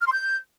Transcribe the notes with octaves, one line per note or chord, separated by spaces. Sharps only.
F6
C6
G6